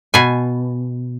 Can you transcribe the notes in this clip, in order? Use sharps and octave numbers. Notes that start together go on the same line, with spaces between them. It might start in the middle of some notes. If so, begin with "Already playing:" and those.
B2 G#5